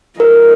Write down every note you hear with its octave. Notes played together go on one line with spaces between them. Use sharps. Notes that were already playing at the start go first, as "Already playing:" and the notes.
F3 G#3 D#4 A#4